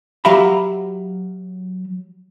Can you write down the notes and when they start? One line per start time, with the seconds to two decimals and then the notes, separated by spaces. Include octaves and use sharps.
0.25 F#3 G4 E5 F5 A#5 B5